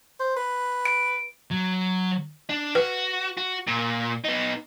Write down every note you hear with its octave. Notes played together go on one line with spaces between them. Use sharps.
C5
B4
D7
F#3
D4
F#4 B4
F#4
A#2
B3 D#4